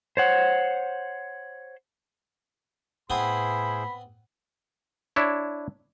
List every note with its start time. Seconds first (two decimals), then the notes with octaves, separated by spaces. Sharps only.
0.17 C5 C#5 F#5
3.10 A2 B3 C4 E4 G#4 B4 C5 B5
5.16 D4 E4 C#5